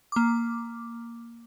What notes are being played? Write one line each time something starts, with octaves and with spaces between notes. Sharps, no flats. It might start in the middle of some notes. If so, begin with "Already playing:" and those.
A#3 D6